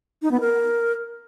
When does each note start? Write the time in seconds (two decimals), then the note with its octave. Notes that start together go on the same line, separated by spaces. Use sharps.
0.22 D#4
0.31 B3
0.40 A#4